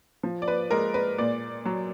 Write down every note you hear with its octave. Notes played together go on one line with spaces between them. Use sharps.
F3
D5
B4
G#3 A#4
B4
A#2 D5
F#3